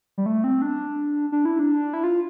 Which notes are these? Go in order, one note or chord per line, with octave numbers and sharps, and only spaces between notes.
G3
A3
C4
D4
D4
E4
D4
E4
F4